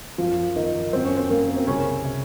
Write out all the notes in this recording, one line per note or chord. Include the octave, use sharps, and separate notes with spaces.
F#2 F3 F4
D#3 F3 D#4
F#2 C4
C#4
C4
F#2 A#3
C4
C2 C#3 C#4
C3